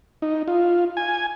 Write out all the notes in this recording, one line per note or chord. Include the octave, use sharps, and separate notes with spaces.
D#4
F4
G#5